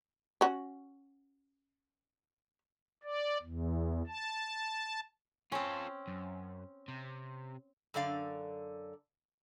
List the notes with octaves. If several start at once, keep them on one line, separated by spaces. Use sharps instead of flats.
C#4 F#4
D5
E2
A5
C4 C#4 F4 A4
F#2
C3
F#2 D3 D5 F5